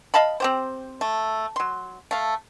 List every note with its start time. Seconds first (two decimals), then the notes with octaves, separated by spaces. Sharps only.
0.14 D#5 F5 A5 B5
0.40 C4 G4 C5
1.01 A3
1.56 F#3 C6
2.11 A3 F5